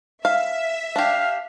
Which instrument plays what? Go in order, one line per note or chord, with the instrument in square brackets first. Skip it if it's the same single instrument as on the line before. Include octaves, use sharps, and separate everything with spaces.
[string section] E5 [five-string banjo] F5
[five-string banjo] D4 G4 [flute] F5